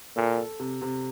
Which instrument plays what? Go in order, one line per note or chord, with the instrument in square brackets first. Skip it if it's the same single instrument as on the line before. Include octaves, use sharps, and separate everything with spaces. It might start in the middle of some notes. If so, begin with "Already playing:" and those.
[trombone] A#2 [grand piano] A4
[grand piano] A4
C3
C3